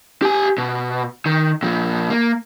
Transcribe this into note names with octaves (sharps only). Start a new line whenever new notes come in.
G4 G#5
B2
D#3
A#2 F3
A#3